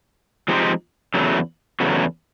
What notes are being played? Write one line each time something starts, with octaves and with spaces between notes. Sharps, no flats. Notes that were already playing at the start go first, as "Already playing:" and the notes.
F3 G#3 C4 D#4 G4
E2 C#3 F#3 A3
E2 C#3 F#3 A3